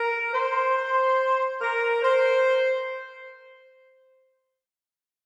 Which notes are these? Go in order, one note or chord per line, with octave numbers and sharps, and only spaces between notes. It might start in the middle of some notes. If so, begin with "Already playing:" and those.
Already playing: A#4
C5
A#4
C5